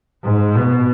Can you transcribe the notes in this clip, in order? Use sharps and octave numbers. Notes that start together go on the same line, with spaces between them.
G#2
B2